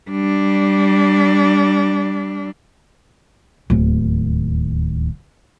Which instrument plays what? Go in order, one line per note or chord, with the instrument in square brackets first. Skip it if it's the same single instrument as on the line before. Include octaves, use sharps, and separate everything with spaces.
[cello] G3 D4
[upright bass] D1 D#2